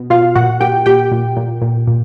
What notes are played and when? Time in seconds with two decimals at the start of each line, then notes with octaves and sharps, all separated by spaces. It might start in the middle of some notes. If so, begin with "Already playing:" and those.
Already playing: B2
0.10 B2 F4 F5
0.35 A#2 F#4 F#5
0.60 A#2 G4 G5
0.86 A#2 G4 G5
1.11 A#2
1.37 A#2
1.62 A#2
1.87 A#2